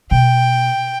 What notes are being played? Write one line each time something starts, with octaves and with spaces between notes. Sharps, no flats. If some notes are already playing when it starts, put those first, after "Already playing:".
B2 G5